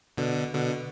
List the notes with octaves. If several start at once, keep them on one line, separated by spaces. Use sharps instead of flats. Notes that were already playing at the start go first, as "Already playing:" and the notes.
B2 D3
B2 D3